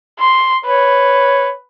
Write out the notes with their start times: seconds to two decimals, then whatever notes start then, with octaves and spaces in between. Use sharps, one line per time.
0.19 C6
0.65 B4 C#5